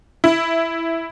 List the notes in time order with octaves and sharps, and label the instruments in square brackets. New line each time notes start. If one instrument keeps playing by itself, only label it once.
[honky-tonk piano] E4